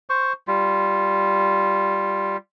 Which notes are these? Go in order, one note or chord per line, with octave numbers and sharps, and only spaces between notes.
C5 C#6
G3 F4